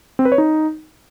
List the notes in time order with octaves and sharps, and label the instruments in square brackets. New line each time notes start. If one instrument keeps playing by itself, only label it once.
[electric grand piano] C4
B4
C#5
D#4